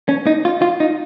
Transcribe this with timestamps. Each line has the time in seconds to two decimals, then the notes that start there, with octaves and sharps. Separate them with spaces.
0.09 C#4
0.27 D#4
0.45 F4
0.62 F4
0.80 D#4